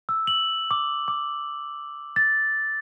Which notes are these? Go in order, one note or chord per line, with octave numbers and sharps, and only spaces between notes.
E6
F#7
D6
D6
A6